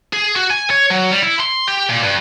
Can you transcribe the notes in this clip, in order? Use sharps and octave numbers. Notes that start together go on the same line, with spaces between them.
G#4
F#4
G#5
C#5
F#3
G3
E4
C6
G4
A#2
G2